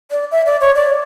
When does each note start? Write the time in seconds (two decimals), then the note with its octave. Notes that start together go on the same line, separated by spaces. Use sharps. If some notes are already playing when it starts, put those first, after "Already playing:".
0.11 D5
0.31 E5
0.46 D5
0.61 C#5
0.76 D5